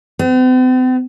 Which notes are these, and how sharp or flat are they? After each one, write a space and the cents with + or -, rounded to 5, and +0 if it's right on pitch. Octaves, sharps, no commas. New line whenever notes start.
C4 -45